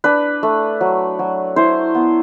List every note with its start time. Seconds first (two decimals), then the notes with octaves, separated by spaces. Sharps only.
0.04 D4 B4
0.43 A3
0.81 F#3
1.19 F#3
1.56 E4 C5
1.95 B3